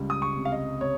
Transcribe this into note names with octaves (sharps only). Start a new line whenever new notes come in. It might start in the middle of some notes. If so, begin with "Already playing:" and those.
Already playing: C#2 G3
D#6
C#6
C3
F5
D#5
C3 C#5